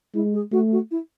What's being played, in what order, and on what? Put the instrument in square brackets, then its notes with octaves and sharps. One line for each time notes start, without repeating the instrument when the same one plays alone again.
[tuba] G#3 [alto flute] E4
[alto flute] G#4
[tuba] A3 [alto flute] F#4
[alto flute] F#4
E4